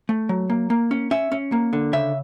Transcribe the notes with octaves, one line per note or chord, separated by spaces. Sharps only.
A3
F#3
A#3
A#3
C#4
C#4 E5
C#4
A#3
D3
C#3 E5